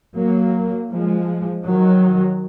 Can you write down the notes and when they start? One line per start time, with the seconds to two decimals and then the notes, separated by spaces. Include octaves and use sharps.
0.17 F#3 A#3
0.91 F3 G#3
1.65 D#3 F#3